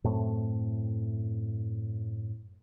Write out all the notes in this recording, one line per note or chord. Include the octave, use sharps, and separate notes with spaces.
F#2 A2 A3 C4